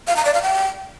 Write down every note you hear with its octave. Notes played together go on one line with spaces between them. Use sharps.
F5
A#5
D5
F5
G5